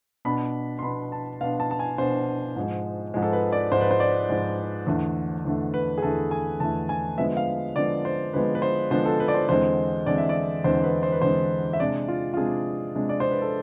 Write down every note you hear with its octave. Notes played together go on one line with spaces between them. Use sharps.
B2 B3 D4 B5
C6
B2 B3 D4 B5
A5
B2 B3 D4 F5
A5
A5
G#5
B2 B3 D4 C5
G#2 F3 G#3
G#2 F3 G#3
A4
B4
D5
G#2 F3 G#3 C5
B4
C5
D5
G#2 F3 G#3
E2 D3 A3
E2 D3 A3
B4
G#4
E2 D3 A3 A4
G#5
E2 D3 A3 A5
G#5
D3 F3 G#3 B3 E5
F5
D3 F3 G#3 B3 D5
C5
D3 F3 G#3 B3 B4
B4
C5
D3 F3 G#3 B3 C5
A4
B4
D5
C5
E2 D3 G#3 C4 C5
E2 D3 G#3 C4 D5
E5
D5
E2 D3 G#3 C4 C5
B4
C5
B4
E2 D3 G#3 C4 C5
E5
C3 G#3 D4 D5
F4
F4
C3 G#3 D4 G#4
C3 G#3 D4
D5
C5
B4
A4